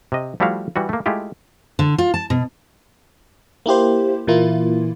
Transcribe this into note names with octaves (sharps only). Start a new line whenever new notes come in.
C3 D#5
F3 G3 A3 E4 F#4 F5
E3 G3 F#4
A3 A#3
G#3 A3 E4 F4 G4
D3
F4
A5
B2
A#3 E4 G4 C5
A#2 E3 A#3 E4 F4